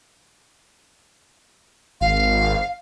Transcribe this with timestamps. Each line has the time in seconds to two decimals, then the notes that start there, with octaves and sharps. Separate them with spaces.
2.01 G#1 F5